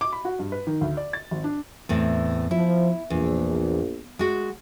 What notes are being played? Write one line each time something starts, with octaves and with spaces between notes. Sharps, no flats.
D6
B5
F#4
G2
B4
D#3
D2
D5
A6
G#1
D4
E2 A2 C4
F3 E4
A#1 E2
G#3 F#4